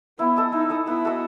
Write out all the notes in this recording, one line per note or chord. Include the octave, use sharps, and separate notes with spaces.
B3 E4
A4 D#5
D#4 E4
A4 D#5
B3 E4
F#4 A4 D#5